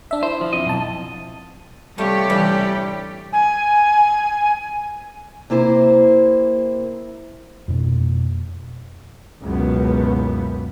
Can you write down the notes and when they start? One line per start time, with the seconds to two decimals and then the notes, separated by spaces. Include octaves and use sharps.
0.11 D4 E5
0.23 E4 C5
0.41 F3
0.53 F2 D#5
0.67 B1 A5
1.98 C3 G3 A3 F4 G4 C#5
2.29 A2 E3 G3 D4
3.33 G#5
5.50 C3 A#3 E4 C5
7.68 F2 B2 A#3
9.43 F#1 C#2 F#2 B2 B3